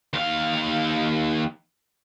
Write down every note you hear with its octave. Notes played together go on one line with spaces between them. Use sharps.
D#2 F5